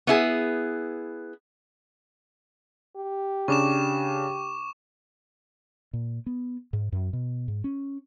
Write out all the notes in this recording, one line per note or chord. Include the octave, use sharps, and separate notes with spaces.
B3 E4 G#4
G4
C#3 D4 C#6 D6 E7
A#2
B3
G#2
F#2
B2
G#2
C#4